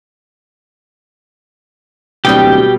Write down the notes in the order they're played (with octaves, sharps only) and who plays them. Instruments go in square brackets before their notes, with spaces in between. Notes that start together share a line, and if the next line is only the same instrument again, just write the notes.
[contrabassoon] D1 [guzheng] B2 G3 [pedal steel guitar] G4 G5